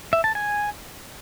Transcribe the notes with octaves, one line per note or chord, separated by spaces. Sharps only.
E5
A5
G#5